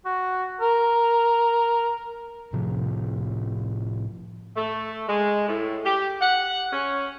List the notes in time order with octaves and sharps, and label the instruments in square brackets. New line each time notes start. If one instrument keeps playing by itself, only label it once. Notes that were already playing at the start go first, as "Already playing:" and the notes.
[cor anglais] F#4
A#4
[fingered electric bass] A2 C3 F3
[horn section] A3
G#3
A2
G4
F#5
C#4